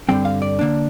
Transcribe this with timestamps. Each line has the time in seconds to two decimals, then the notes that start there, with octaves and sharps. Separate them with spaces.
0.09 G2 D3 G3 C4 G5
0.25 F5
0.42 D5
0.59 D3 A#3 D4